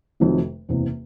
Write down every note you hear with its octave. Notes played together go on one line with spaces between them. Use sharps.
F1 F2 C3 D#3 F#3
F#1 E2 C3